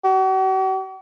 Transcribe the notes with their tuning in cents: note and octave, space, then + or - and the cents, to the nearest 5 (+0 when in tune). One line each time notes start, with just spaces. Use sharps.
F#4 +45